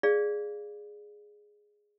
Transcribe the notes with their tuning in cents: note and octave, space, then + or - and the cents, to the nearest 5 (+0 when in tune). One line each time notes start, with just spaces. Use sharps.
G#4 +0 D5 +0 F5 +0